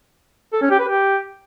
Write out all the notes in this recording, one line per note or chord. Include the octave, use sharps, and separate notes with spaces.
A4
C#4
G4
B4
G4